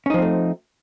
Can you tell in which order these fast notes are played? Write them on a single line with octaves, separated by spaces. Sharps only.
C#4 D#4 F3 C4 A3